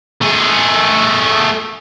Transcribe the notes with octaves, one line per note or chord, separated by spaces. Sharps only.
A3 G#4